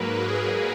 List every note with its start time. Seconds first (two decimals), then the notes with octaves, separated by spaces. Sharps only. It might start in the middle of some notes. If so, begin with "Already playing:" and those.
Already playing: G#2 F#3 A#3 A#4 B4
0.27 G#4